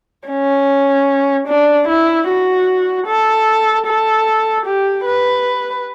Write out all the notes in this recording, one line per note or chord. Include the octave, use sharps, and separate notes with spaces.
C#4
D4
E4
F#4
A4
A4
G4
B4